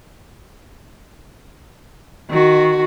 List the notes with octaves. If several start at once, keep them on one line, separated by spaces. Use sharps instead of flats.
D#3 F#4